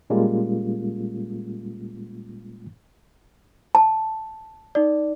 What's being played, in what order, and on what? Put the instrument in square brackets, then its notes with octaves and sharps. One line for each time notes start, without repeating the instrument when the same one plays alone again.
[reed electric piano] A#2 G3 G#3 A#3 C#4 F4
[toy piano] A5
[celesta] D#4 D5